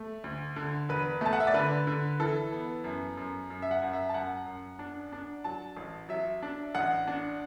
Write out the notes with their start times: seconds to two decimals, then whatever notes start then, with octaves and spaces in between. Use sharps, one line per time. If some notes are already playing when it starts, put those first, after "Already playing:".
Already playing: A3
0.24 D2
0.56 D3
0.89 E1 B4
1.21 A3 A5
1.33 F#5
1.40 E5
1.47 D5
1.54 D3 B4
1.87 D3
2.20 E3 A4
2.52 B3
2.84 F#2
3.17 F#2
3.50 F#2
3.62 E5
3.71 F#5
3.82 F#2
3.93 E5
4.09 A5
4.14 F#2 F#5
4.46 F#2
4.79 D4
5.13 D4
5.44 F#3 A5
5.76 A1
6.09 F#3 E5
6.43 D4
6.75 A1 F#5
7.07 D4